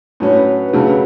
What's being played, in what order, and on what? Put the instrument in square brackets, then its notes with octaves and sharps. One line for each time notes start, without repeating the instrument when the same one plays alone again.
[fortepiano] A2 F#3 C#4 [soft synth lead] B4
[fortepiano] C#3 F#3 A3 [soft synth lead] B4